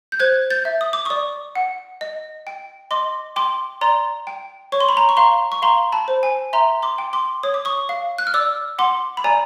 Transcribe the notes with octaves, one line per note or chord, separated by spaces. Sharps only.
G6
C5 F#6 G#6
G6 A6
E5
D#6
D6
D5 C#6 D#6
F#5
D#5
G5
D#5 C6 D6
G5 C6 D6
D5 A#5 C6
G5
C#5 C#6
C6
B5
A#5 C6
C#6
F5 A#5 C6
C#6
F5 A#5 C6
A5 B5
C5
G#5
E5 A#5 C6
C6 D6
G5
C6 D6
C#5 D#6
D6
C#6 D#6
F5
F#6
F6
D5 D6 E6
F#5 C6 D6
B5
D5 G#5 A#5